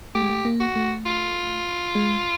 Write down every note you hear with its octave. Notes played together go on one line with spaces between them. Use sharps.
A3 G4
G#3
A3
A#3
F#4
A3
F4
G#3